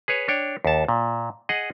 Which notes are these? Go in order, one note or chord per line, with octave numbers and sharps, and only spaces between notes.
G#4 B4 C#5
D4 C#5 G5
D#2 A5
A#2
G#4 D#5 F#5